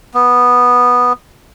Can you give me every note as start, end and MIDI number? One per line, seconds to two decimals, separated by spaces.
0.14 1.13 59